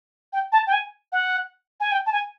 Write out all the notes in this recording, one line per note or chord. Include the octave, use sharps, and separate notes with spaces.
G5
A5
G5
G#5
F#5
G#5
G5
A5
G#5